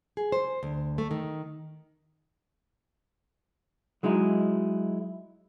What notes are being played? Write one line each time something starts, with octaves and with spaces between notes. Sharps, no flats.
G#4
C5
D2
A3
D#3
F#3 G#3 D#4 E4